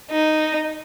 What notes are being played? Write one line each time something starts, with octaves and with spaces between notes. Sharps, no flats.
D#4